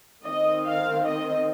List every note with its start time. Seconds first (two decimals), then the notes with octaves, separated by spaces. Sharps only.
0.25 D#3 C4 D#5
0.66 F5
1.05 D#5